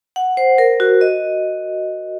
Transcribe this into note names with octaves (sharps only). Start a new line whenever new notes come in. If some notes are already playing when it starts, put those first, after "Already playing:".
F#5
C5
A#4
F#4
D#5